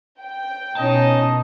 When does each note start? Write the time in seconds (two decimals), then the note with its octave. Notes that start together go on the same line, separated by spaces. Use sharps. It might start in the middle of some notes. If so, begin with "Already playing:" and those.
0.22 G5
0.77 B2 C#4 D#4 D#5 A5